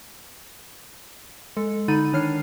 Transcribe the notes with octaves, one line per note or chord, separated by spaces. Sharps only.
G#3 A4
D3 D#4 B5 A6 D#7
D#3 D4 C#5 F6 C7